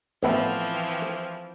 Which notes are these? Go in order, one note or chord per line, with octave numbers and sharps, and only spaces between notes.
A1 E3 F3 B3 C4 E5